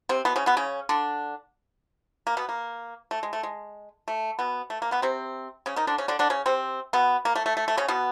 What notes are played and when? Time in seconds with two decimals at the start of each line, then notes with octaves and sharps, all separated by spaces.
0.09 C3 C4
0.25 B2 B3
0.36 C#3 C#4
0.46 B2 B3
0.57 C#3 C#4
0.89 D3 D4
2.27 A#3
2.37 B2 B3
2.49 A#3
3.11 A3
3.23 G#3
3.33 A3
3.43 G#3
4.08 A3
4.39 B2 B3
4.70 A3
4.82 A#3
4.91 B2 B3
5.02 C3 C4
5.66 C#3 C#4
5.76 D#3 D#4
5.87 D3 D4
5.98 C#3 C#4
6.08 D3 D4
6.19 D3 D4
6.30 C#3 C#4
6.46 C3 C4
6.93 B2 B3
7.25 A#3
7.35 A3
7.46 A3
7.57 A3
7.68 A3
7.77 C#3 C#4
7.88 B2 B3